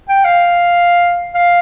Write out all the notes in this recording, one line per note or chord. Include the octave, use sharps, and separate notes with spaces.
G5
F5
F5